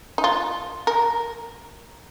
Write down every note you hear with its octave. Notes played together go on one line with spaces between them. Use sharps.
D#4
F4
A#4